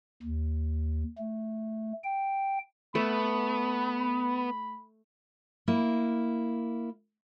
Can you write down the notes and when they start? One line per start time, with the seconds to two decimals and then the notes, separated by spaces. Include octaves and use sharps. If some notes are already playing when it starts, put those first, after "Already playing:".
0.23 D#2
1.18 A3
2.04 G5
2.95 A3 B3 B5
5.68 A#3 E4